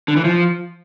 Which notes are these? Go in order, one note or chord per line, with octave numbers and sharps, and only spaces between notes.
D3
E3
F3